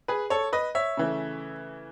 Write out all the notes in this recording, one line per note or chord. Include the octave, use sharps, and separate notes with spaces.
G#4 B4
A4 C#5
B4 D#5
C#5 E5
C#3 E3 A3